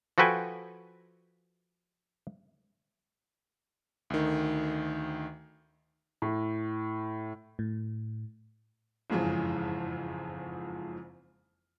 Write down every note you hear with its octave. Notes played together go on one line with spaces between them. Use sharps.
F3 F#4 A4 B4 G5 G#5
D2 D#3
A2
A2
F#1 F2 G#2 C#3 E3 F3